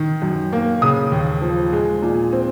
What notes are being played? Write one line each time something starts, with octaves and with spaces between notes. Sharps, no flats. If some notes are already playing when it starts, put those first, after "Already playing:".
Already playing: D#3
F#2
A#3
C#3 D#6
D#2
F3
G#3
A#2
C4